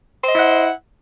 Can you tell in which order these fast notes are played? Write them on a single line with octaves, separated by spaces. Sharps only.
C5 D#5 E4 F#5